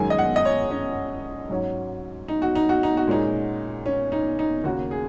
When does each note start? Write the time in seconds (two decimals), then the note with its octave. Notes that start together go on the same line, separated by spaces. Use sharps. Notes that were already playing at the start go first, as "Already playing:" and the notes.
Already playing: F#2 D#3 G#3 G#5
0.10 D#5
0.18 F#5
0.36 D#5
0.45 C#5
0.71 C#4
1.50 G#2 F#3 C#4
2.28 D#4
2.42 F#4
2.55 D#4
2.69 F#4
2.83 D#4
2.97 F#4
3.08 A#2 G#3 C#4 D#4
3.86 C#4
4.12 D#4
4.39 D#4
4.64 D#2 C#3 A#3 F#4
4.91 G#4